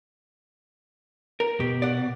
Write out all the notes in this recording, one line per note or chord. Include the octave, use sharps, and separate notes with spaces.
A#4
B2 G4
D5 F#5